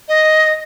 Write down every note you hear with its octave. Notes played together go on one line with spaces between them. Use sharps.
D#5